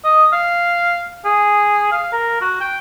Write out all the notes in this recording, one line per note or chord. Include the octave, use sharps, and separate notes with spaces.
D#5
F5
G#4
F5
A#4
F#4
G5